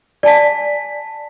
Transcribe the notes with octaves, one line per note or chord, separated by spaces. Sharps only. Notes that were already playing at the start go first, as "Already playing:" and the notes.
D5 G#5 A5 B6